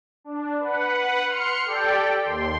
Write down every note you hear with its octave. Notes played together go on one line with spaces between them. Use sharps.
D4
B4 F#5
C6 F6 C#7
G4 A4 D5 G5
D#2 C6